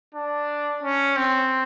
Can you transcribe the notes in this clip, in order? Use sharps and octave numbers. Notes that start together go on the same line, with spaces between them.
D4
C#4
C4